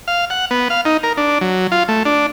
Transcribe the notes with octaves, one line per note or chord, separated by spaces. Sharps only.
F5
F#5
B3
F5
D#4
A#4
D4
F#3
F4
A3
D4